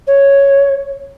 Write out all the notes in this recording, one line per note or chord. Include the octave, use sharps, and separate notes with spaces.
C#5